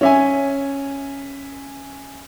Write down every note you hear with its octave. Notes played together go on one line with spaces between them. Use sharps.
C#4 E5 G#5